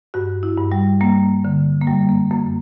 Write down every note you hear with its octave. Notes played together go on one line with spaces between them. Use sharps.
G2 F#4
E4
G2
G3
G3 A#3
D3
A#3
F#2 G3
A#3
F#2 A#3